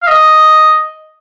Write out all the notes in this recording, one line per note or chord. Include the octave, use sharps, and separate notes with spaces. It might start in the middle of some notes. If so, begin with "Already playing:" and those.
F5
D#5